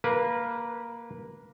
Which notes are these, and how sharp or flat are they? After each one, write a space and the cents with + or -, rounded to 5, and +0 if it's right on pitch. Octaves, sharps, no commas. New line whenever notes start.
A#3 +0 B4 -20